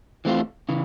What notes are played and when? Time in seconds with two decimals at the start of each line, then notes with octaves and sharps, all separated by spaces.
0.25 E3 A3 C4 F4
0.69 C#3 E3